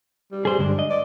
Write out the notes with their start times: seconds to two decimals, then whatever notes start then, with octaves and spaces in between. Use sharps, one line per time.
0.32 G3
0.45 G3 G#4 C5
0.59 G2 D3 G#3 D4
0.79 D#5
0.90 D5